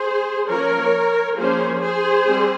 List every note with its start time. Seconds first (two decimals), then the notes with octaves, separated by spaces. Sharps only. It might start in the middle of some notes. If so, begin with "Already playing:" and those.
Already playing: G#4 C5
0.48 F3 A#3 C#4 A#4 C#5
1.37 F3 A#3 C#4 G#4 C5
1.81 G#4 C5
2.26 G3 C4